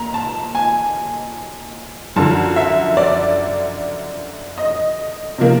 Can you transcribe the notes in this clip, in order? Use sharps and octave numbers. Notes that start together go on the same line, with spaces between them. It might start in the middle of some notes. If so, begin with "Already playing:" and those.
Already playing: A#2 A#5
A5
G#5
F#2 D3 F3 A5
E5
D5
D#5
C3 F3 A#3